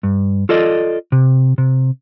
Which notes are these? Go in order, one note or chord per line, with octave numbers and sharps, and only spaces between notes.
G2
F4 A4 D5 D#5
C3
C3